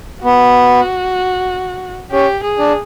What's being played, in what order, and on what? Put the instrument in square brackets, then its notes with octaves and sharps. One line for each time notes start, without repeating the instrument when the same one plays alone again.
[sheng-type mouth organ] B3 [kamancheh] F#4
[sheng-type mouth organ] C#4 [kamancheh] G4
[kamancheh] G#4
[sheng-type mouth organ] D4